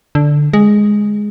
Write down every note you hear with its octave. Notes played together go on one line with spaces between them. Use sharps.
D3
G#3